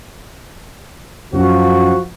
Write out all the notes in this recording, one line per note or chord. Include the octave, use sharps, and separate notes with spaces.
F#2 F3 F#4